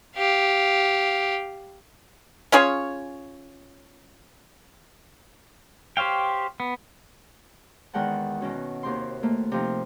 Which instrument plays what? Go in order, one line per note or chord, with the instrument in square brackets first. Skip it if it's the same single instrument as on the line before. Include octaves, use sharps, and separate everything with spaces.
[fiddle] G4 F5
[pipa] C#4 F4 G#4 C#5
[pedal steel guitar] G4 C5 C#5 F5 G5
B3
[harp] E2 D#3 G#3 F#5 G5 A5
B2 D#3 C#4 F#4
D#2 C3 C4 C6
A3 A#3
C3 F3 D#4